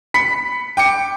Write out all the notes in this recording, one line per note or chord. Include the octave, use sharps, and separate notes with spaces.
B5 B6 C#7
G5 D6 C#7